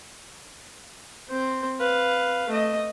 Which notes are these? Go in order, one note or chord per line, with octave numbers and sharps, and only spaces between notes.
C4 C5
B4 F5
A3 D#5